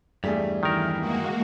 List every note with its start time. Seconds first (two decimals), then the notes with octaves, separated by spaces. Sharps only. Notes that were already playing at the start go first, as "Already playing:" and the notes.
0.24 E2 G2 G3 A3 G#4
0.63 D#3 E3 A#4
1.00 G#3 A#3 F#4